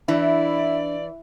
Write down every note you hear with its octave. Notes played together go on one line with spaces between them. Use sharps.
E3 D4 E4 D5